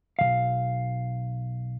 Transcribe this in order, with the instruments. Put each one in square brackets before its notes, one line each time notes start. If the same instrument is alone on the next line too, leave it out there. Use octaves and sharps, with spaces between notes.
[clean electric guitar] B1 C3 F5